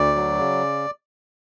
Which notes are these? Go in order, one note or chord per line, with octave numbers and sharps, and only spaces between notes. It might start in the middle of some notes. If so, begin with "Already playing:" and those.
Already playing: D2 D5
F#3
C#3